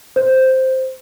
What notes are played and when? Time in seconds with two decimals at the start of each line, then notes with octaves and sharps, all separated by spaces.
0.16 C5